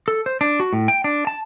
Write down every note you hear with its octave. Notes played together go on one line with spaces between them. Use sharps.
A4
C5
D4
F#4
A2
G5
D4
A5